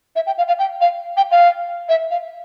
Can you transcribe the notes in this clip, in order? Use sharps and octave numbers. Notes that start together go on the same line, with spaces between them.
E5
G5
F5
F5
G5
F5
G5
F5
E5
F5